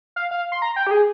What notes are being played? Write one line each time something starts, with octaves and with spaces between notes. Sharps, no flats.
F5
F5
C6
A#5
G5
G4
G#4